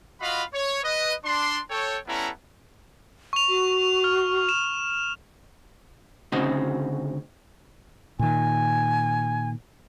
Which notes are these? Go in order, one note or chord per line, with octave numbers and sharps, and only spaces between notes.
F4 F#4 D#5 F5 B5
C#5
B4 D#5
D4 C6
A4 C#5 G5
G3 B3 C#4 E4 A4 A#5
C#6 F7
F#4
F6
E7
D2 C#3 C4 D#4 F#4 D#5
A#2 D#3 G#5